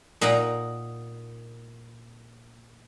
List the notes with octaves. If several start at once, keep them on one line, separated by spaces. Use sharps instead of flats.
A#2 D#4 F#5 A#5